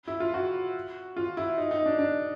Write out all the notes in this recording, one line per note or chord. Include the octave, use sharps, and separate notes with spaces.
E4
F4
F#4
F4
E4
D#4
D#4
D4
D4